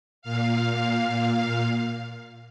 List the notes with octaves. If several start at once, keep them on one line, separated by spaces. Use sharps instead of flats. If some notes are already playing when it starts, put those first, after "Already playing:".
A#2 F5